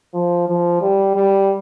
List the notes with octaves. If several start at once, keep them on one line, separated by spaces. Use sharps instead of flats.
F3
F3
G3
G3